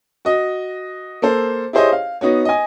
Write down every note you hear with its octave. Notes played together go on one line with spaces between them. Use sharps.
F#4 D#5
A#3 A4 C5
E4 G4 G#4 C5 C#5 D#5
F5
B3 D#4 F#4 C#5
D#5 G#5